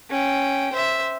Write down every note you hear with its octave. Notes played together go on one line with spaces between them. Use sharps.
C#4 G5
C5 E5